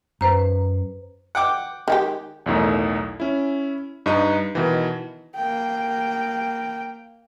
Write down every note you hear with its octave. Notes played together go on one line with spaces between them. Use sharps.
F#2 B4 C5 A#5
F#5 G5 D6
D#3 G#3 G4
B1 E2 A2 D#3
C#4 E4
G2 D#4 B4 D#7
B2 D#3 E3
A#3 G5